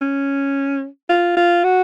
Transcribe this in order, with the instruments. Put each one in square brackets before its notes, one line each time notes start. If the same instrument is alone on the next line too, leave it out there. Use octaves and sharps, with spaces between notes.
[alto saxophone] C#4
F4
F4
F#4